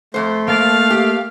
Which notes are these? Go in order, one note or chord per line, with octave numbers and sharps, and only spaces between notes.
F2 A3 C5
A#3 F5 A5 D6
G4